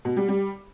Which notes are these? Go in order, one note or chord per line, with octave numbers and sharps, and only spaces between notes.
B2
G3
G3